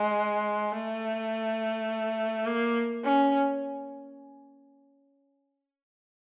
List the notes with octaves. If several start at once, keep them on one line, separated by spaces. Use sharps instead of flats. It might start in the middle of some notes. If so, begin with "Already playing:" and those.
Already playing: G#3
A3
A#3
C#4